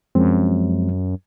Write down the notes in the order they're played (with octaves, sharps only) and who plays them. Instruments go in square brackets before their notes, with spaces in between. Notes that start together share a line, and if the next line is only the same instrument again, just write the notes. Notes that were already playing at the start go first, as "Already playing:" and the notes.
[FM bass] F#2 [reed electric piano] F3 G#3 C4